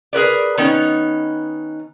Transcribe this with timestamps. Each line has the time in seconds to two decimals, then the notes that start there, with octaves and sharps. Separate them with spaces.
0.13 G#4 A#4 B4 D5
0.58 D#3 B3 C#4 D#4